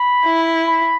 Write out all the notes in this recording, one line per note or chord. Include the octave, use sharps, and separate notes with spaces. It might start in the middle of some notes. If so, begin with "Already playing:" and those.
Already playing: B5
E4
B5